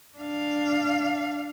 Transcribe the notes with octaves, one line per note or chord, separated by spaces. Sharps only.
D4 F5